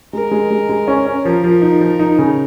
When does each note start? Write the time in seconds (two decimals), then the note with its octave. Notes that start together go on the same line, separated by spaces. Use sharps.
0.13 G#3 A#4
0.31 G#3
0.50 G#3
0.69 G#3
0.88 C#4
1.06 C#4
1.24 F3 A#4
1.44 F3
1.62 D#4
1.81 F3
1.99 D#4
2.18 C#3